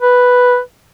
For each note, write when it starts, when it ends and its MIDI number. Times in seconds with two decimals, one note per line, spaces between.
0.02 0.59 71